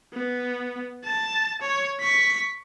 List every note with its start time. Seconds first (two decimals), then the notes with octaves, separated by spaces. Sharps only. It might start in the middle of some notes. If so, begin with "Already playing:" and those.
0.14 B3
1.04 A5
1.61 C#5
2.00 C#6 B6